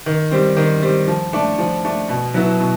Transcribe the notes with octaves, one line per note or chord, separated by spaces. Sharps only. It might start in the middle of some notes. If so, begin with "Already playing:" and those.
D#3
G3 C4
D#3
G3 C4
F3
A3 D4
F3
A3 D4
B2
F#3 B3 E4
B2